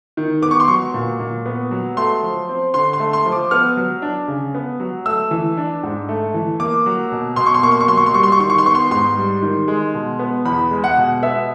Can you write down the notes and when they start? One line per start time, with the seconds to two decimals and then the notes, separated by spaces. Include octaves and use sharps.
0.17 D#3
0.42 B3 D6
0.51 C#6
0.60 C6
0.68 F#3 C#6
0.94 A#2
1.20 A#2
1.46 B3
1.71 F#3
1.97 A3 C6
2.23 F3
2.49 C4
2.74 D3 C6
2.93 C6
3.00 A3
3.13 C6
3.26 F3
3.32 D6
3.51 B3 F6
3.77 F#3
4.02 D4
4.28 C#3
4.55 B3
4.80 F#3
5.06 A3 E6
5.31 E3
5.57 D4
5.83 G#2
6.09 A3
6.34 E3
6.60 A#3 D6
6.86 F#3
7.12 B2
7.36 B2 C6
7.46 C#6
7.54 C6
7.62 A#3 C#6
7.72 C6
7.80 C#6
7.88 F#3 C6
7.97 C#6
8.06 C6
8.14 G3 C#6
8.23 C6
8.32 C#6
8.40 D#3 C6
8.50 C#6
8.58 C6
8.65 B3 C#6
8.75 C6
8.91 G#2 C6
9.17 G3
9.42 D#3
9.68 G#3
9.94 B2
10.19 B3
10.45 E2 B5
10.71 G#3
10.84 F#5
10.97 B2
11.22 B3 E5